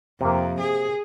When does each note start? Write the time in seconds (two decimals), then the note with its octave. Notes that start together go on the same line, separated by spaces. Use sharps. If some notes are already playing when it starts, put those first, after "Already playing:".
0.21 F2 C3 A#3
0.60 G#4